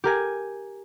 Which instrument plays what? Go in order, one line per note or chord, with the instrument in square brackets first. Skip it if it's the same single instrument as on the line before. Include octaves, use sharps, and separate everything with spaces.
[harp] G4 A#4 G#5